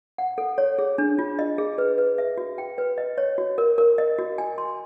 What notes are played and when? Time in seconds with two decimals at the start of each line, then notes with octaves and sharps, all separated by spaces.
0.18 F#5
0.38 A4
0.58 C#5
0.79 G#4
0.98 D4
1.19 F4
1.39 D#5
1.58 G#4
1.78 B4
1.98 B4
2.18 E5
2.38 F#4
2.58 G5
2.78 B4
2.98 D#5
3.18 C#5
3.38 F#4
3.58 A#4
3.78 A#4
3.98 D#5
4.18 F#4
4.38 G#5
4.58 C6